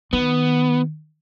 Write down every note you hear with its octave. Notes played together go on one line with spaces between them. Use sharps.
D#3 B3